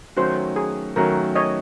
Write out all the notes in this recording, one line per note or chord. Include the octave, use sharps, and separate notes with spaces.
D#3 F#3 A3 C#4 F#4 C5
G#4
D#3 F#3 A3 C#4 F#4 A#4
C#5 D#5